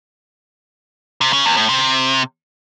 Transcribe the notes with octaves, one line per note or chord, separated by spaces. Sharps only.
C3
C#3
E2
A2
C3